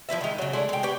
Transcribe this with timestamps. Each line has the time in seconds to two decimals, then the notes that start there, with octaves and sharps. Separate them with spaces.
0.09 F3 E4 B4 E5
0.21 D#3 G#3
0.38 C#3 F#3
0.53 G#3 A3 D4 E4
0.69 G#3 G5
0.83 G4 B4 C#5